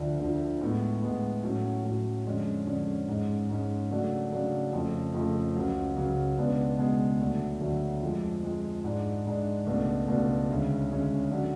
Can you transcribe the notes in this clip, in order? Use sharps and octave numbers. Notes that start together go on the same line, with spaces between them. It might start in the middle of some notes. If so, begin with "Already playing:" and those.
Already playing: D2 D3 F3
D2 D3 F3
A2 G#3 B3
A2 G#3 B3
A2 F#3 C#4
A2 F#3 C#4
F2 D3 G#3 C#4
F2 D3 G#3 C#4
G#2 G#3 C#4
G#2 G#3 C#4
C#3 F#3 A3 D4
C#3 F#3 A3 D4
F2 C#3 F3 A3
F2 C#3 F3 A3
C#2 C#3 F#3
C#2 C#3 F#3
C#2 B2 G#3 B3 D4
C#2 B2 G#3 B3 D4
D2 D3 F#3 A3
D2 D3 F#3 A3
F2 F3 G#3
F2 F3 G#3
G#2 G#3 D4
G#2 G#3 D4
C#2 B2 A3 D4
C#2 B2 A3 D4
D2 C#3 G#3 C#4
D2 C#3 G#3 C#4
D3 F#3 C#4